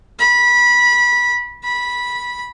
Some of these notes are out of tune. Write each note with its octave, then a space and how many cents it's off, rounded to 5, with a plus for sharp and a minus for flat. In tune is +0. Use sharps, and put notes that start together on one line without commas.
B5 -20
B5 -15